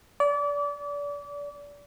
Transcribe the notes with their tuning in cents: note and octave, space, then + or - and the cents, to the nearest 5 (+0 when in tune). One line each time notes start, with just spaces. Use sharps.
D5 -30